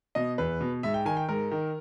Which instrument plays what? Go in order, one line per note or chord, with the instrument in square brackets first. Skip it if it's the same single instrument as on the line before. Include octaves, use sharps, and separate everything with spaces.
[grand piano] B2 D#5
E2 B4
B2
G#2 E5
G5
D#3 G#5
G5
G#2 A#4
D#3